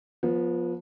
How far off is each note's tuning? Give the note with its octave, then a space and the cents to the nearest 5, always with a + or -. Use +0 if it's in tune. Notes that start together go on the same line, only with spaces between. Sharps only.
F3 +10 B3 -25